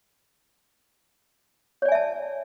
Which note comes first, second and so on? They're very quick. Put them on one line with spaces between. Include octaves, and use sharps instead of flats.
C#5 D5 G#5 E5 A5